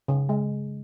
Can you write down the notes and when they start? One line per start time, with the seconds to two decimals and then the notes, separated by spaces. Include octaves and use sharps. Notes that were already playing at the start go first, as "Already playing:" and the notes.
0.08 C#3
0.29 G#3